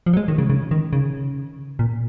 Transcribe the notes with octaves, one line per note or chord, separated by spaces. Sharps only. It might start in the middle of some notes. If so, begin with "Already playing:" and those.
F3
F#3
G#3
D#3
C#3
C#3
D#3
C#3
A#2